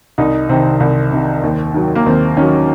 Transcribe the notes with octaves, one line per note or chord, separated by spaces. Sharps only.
C2 D#4
C3 D#3 C4
C2
C3 D#3
D#2
D#3 F#3
A#3
D#2 C4
D#3 F#3 C#4